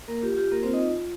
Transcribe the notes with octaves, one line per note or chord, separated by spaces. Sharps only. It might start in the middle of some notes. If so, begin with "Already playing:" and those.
A#3 A#4
F4 G4
F4 G4
A#3 A#4
C4 C5
F4
D#4 D#5
F4
F4